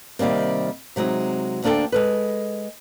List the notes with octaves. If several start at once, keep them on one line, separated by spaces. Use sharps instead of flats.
C3 D#3 G3 A#3 C4
C3 F#3 G#3 C4 D#4
D2 A#3 D4 A4 G5
G#3 A4 B4